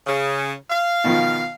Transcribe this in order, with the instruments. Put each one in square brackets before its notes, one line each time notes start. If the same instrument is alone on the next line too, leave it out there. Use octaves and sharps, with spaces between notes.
[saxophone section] C#3
F5
[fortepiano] B2 D#3 F3